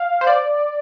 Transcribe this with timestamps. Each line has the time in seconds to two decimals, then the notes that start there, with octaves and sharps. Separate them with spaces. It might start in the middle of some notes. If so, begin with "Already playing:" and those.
Already playing: F5
0.21 C5
0.27 D5